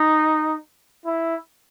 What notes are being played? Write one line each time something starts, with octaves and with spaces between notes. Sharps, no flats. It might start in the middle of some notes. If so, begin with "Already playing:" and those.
Already playing: D#4
E4